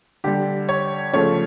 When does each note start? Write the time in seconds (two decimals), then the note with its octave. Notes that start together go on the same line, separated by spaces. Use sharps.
0.24 D3 G3 G4
0.69 C#5
1.13 C#3 F3 A3 C#5